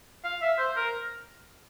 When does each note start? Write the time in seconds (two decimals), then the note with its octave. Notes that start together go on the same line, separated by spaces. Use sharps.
0.24 F5
0.41 E5
0.58 C5
0.76 A#4